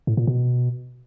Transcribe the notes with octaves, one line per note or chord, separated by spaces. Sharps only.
A2
A#2
B2